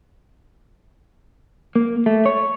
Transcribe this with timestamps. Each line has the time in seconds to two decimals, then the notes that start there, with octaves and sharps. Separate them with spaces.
1.76 A#3
2.06 A3
2.26 C#5